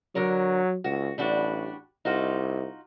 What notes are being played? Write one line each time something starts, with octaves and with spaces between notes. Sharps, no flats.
D3 F#3 A#4 C#5
C#2 F#4
A1 G3 D4 F#4
C2 D#4 F4 F#4